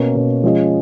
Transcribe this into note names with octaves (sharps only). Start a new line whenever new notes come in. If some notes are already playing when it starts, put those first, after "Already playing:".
Already playing: B2 A#3 C#4
B2 A#3 C#4
F3 G#3 C#4 G#4 D#5